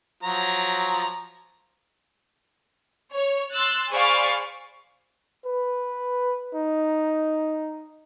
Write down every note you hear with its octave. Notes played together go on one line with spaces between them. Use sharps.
F3 F#3 A#5
C#5
C6 E6 F#6 A6
G#4 C5 D5 F5 B5 C#6
B4
D#4